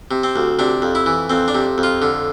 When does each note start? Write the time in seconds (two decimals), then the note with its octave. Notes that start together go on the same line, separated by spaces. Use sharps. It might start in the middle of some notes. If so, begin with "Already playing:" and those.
0.11 C3
0.23 C4
0.36 D2
0.59 C3 D4
0.82 F2
0.95 E4
1.06 E3
1.30 F2 C4
1.48 D4
1.55 C3
1.78 F2
1.83 F4
2.02 D3